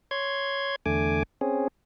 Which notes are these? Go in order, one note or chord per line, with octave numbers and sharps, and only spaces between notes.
C#5 C6 G#6
E2 D3 A3 G#5 D6
C4 C#4 G#4